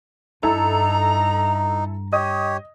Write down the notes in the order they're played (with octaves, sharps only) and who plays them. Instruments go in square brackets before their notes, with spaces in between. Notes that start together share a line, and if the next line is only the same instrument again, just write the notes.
[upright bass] G2 [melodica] D#4 [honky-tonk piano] E4 A4 [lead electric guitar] A#5
[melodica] G4 C#5 [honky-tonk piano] D#5 D#6